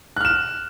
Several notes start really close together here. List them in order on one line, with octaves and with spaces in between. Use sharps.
F#6 F6 E7